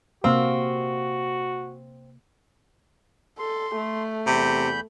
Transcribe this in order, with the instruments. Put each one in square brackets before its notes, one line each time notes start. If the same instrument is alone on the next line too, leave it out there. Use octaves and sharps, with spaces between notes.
[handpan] C3 A#3 F5 [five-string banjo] C4 [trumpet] F#4
[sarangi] A4 [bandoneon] C6
[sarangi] A3
[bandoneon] E2 B5 G6 [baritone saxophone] C3